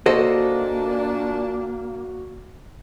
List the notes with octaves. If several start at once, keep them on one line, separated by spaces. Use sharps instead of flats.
A#2 A#3 D4 F#4 A4 C5 D#5